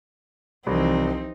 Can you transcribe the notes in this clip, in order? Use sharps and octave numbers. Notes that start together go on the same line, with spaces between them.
C2 E3 F3 C4 D#4